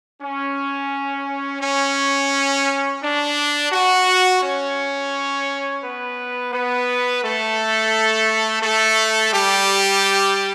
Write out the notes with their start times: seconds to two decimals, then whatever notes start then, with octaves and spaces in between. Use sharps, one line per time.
0.20 C#4
1.61 C#4
3.02 D4
3.71 F#4
4.41 C#4 C#5
5.81 B3 B4
6.51 B3 B4
7.21 A3 A4
8.62 A3 A4
9.31 G3 G4